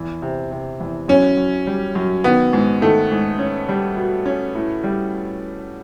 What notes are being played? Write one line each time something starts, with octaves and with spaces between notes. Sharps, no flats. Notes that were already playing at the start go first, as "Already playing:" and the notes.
Already playing: E2
C3
C3
E2
F#2 C#4
F#2
G3
F#2
D#3 B3
G#2
D#3 A3
G#2
C#4
G3
B2
C#4
A2
G3